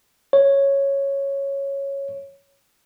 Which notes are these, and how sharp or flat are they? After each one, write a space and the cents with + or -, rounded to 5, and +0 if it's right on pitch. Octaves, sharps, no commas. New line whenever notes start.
C#5 -5